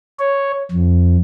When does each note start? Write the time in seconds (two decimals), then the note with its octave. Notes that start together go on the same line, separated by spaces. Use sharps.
0.19 C#5
0.71 F2